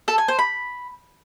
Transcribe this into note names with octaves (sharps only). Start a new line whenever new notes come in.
A4
G#5
C5
B5